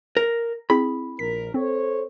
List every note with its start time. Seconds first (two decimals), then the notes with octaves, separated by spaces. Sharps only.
0.17 A#4
0.70 C4 E4 G#4 B5
1.19 A#1 A#4 B6
1.54 C4 A4 C5 C#5